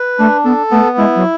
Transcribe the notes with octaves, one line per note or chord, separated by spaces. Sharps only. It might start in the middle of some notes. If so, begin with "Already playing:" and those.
Already playing: B4
A3 D4
B3 A4
A3 B3
G#3 E4
F#3